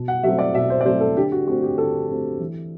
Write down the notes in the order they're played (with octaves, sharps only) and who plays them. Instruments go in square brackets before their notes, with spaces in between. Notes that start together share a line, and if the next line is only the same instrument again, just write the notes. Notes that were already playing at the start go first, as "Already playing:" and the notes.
Already playing: [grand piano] B2
F#5
F#3 A3 C4 E5
D5
B2 E5
C5
D5
F#3 A3 C4 C5
A4
D3 G4
F#4
A3 C4 F#4
G4
D3 A4
A3 C4
E3